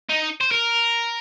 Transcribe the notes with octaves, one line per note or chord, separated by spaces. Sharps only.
D#4
C5
A#4